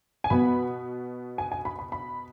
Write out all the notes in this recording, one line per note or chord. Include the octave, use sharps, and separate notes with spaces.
G#5
B2 B3 B5
G#5
G#5
B5
B5
B5